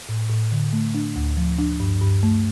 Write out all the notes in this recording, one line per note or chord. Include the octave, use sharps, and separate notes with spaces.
A2
A2
D3
A3
D4
D2
F3
D4
G2
G2
A3